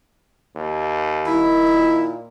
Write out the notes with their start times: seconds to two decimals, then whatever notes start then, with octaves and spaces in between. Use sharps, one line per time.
0.56 D#2
1.27 D#3 E4
1.74 A#2